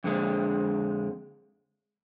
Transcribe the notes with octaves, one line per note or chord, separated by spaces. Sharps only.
F2 D3 G#3